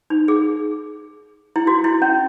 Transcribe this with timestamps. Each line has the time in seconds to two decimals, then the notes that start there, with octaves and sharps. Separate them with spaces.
0.10 D#4
0.28 G#4
1.56 E4
1.67 F#4
1.84 E4
2.02 C#4